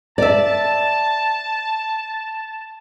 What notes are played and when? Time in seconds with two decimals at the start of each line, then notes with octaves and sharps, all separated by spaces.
0.18 D5 E5 A5